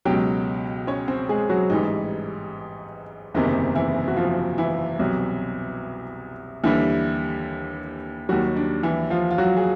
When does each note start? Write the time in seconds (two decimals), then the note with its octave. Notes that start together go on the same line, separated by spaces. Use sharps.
0.05 C#2 B2 F#3 G4 G5
0.87 C#4 C#5
1.08 C4 C5
1.29 G#3 G#4
1.49 F#3 F#4
1.70 A1 G#2 E3 G3 D#4
3.34 F#1 E2 C3 D#3 D#4
3.75 E3 E4
4.08 F#4
4.16 F3 F4
4.58 E3 E4
4.99 C2 B2 F#3
6.64 D#2 D3 E3 G3 E4
8.29 D#2 D#3 F#3 G3 F#4
8.56 D4
8.83 E3 E4
9.10 F3 F4
9.31 F4
9.38 F#3 F#4
9.57 G#4